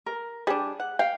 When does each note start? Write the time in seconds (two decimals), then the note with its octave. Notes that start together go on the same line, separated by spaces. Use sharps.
0.06 A#4
0.47 G3 D4 G#4
0.80 F#5
0.99 F5 G5